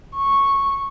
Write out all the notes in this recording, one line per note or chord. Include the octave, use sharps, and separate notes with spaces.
C#6